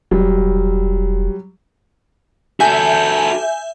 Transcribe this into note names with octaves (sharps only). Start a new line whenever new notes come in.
E1 F#3 G3
F#4 A4 E5 G#5 G6